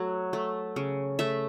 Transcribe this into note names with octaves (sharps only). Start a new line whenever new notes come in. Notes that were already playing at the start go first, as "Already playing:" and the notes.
Already playing: F#3 A3
A3
C#3
A3 E5